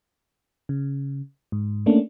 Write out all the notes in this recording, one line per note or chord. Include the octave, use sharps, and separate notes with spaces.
C#3
G#2
A3 A#3 C#4 D4